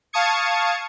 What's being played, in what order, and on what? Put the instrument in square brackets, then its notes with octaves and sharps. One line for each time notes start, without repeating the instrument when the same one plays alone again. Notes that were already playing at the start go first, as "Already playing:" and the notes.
[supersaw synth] F5 A5 C#6 D#6 G#6 C#7